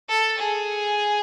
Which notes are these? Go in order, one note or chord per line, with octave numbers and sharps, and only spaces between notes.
A4
G#4